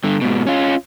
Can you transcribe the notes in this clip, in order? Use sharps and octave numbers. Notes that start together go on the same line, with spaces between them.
G2 D3
G#2 B2
C#4 F4